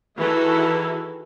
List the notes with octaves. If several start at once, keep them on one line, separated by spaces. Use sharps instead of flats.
D#3 E3 E4 F#4 G#4 A4